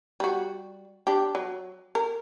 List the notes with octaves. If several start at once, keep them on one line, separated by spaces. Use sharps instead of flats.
G3 F#4
D4 G4
F#3
A#4